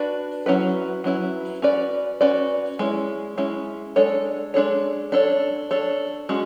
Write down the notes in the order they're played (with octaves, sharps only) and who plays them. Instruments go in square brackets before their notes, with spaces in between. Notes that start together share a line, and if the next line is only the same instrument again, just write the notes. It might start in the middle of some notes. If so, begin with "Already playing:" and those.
Already playing: [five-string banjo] D4 F#4 B4 D5
F#3 C#4 E4 B4
F#3 C#4 E4 B4
C#4 F#4 B4 D5
C#4 F#4 B4 D5
G#3 C#4 E4
G#3 C#4 E4
G#3 D4 A4 C#5
G#3 D4 A4 C#5
D4 A4 C#5
D4 A4 C#5
G#3 C#4 F#4